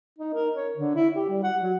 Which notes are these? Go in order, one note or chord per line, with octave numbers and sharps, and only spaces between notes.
D#4
A#4
C#5
D3
E4
G4
G3
F#5
F#3